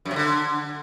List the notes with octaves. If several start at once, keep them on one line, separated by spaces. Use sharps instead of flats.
F#2
C3
D3